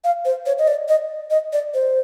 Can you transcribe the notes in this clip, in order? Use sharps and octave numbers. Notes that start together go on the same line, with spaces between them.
F5
C5
C#5
D#5
D5
D#5
D#5
D5
C5